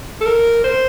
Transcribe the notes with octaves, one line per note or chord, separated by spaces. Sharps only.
A4
A#4
C5